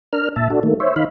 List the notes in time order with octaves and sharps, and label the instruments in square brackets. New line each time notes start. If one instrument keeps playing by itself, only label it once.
[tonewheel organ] D4 A#4 F6
A#2 E5 A5
D4 F#4 A4
D#3 A3 A#3
C5 C#5 E5
D#3 D#4 F5 B5